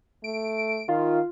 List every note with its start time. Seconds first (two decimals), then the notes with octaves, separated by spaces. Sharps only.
0.24 A3 D7
0.89 D#3 F4